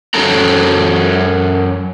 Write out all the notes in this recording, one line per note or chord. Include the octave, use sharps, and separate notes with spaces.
F#2 C#4 A4 A#5